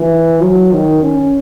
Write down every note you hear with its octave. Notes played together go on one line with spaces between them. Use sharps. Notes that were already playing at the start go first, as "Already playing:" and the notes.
Already playing: E3
F#3
D#3
C#4